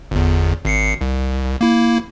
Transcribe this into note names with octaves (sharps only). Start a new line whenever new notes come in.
G1 E2
G#1 C7 C#7
C2
A#3 E4